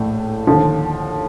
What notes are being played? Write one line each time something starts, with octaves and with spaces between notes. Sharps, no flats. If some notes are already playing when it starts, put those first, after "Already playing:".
Already playing: A#1 A2 A3
D#2 D3 F3